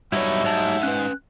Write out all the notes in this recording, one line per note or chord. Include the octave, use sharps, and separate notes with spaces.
G2 B2 F#3 G3 D#4 E4 C#5 E5
G#2 C#5 A5
C#4 B4 F#6